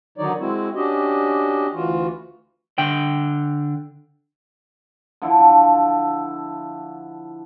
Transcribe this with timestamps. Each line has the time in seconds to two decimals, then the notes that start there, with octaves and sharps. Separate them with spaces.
0.18 D3 D#3 F#3 D#4 C#5 D5
0.39 G#3 C4 E4 F#4
0.75 C#4 D4 F#4 G4 D#5
1.74 D2 E3 F4 F#4
2.78 D3 G5
5.22 D3 F3 D4 E4